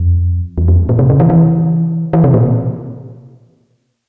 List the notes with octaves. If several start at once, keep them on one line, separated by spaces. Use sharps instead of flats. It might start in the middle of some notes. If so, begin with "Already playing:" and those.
Already playing: F2
E2
F2
A#2
C3
C#3
E3
E3
E3
C3
A#2